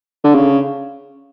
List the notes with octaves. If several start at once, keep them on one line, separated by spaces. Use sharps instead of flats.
D3
C#3